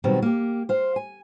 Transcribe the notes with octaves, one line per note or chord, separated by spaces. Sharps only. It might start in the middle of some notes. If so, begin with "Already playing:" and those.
B2 D#3 F#3 G3 B3 C4
A#3 G4
C5 F5
G#5